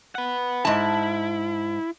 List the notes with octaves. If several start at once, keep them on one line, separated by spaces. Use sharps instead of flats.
B4 F#5
G#2 E4 A5